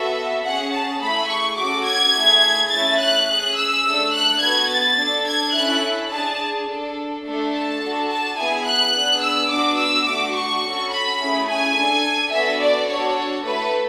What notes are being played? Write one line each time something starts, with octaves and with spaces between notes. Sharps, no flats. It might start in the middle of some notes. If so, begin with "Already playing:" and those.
Already playing: B3 F#4 A4 E5
C#4 G#4 F#5
A5
A3 E4 G#4 B5
C#6
C#4 F#4 A4 D6
G#6
A3 E4 G#4
A3 C#4 E4 A6
F#6
C#4 G#4 F#6
E6
A3 D4 A4
F#6
B3 F#4 A4 G#6
A6
D4 A4
G#6
C#4 E4 A4 F#6
D4 G#4 A5
D4 A4
A3 D4 A4
A5
D4 F#4 A4
A5
B3 E4 G#4 G#5
F#6
B3 D4 G#4
E6
B3 D4 F#4 D6
E6
A3 D4 F#4 D6
C#6
C#4 F#4 A4
B5
A3 C#4 E4 G#4
G#5
D4 A4
B3 D4 F#4 A4 E5
D5
D4 F#4 A4 C#5
A3 E4 A4 B4